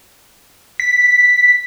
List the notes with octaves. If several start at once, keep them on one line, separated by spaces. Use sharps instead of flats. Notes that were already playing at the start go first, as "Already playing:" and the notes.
B6